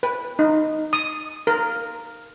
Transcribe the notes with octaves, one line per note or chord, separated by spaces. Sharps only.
B4
D#4
D#6
A#4